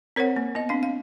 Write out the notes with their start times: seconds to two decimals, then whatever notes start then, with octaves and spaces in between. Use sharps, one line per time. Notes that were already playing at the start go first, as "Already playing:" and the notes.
0.16 C4 A#4 C5 C#5 F#5
0.36 A#3
0.55 B3 D#5
0.69 C4 D4 F5
0.83 F5